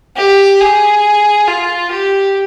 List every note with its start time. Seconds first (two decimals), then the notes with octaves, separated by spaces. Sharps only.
0.16 G4
0.60 G#4
1.48 F4
1.91 G4